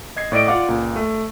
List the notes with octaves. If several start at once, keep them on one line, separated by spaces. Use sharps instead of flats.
D#5 G#6 C7
A2 D5 D#5 D7
F4 D5 F5 F#5 D6
C#2 A#2
A3